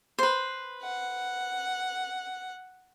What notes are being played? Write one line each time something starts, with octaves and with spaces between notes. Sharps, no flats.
B4 C5
F#5